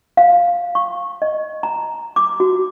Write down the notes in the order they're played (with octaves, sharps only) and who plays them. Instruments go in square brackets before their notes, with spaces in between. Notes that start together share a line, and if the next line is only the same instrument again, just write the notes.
[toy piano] F5
C#6
D#5
A#5
D6
F#4